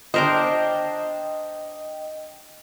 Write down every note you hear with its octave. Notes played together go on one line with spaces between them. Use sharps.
D4 A#4 C5 D#5 G5